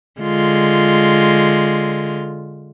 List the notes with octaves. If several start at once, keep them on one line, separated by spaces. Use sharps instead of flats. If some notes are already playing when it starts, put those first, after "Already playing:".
D3 G#3 F4